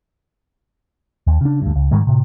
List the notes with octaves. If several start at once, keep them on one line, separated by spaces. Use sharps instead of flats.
D#2
C#3 D4
D2 G2
C#2
G#2 D#3 G3 G#3
A2 C3